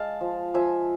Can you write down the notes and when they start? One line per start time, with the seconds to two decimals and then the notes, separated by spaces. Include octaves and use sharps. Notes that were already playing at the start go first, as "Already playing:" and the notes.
Already playing: G#3 F5 A5
0.21 F3
0.54 F3 E5 G#5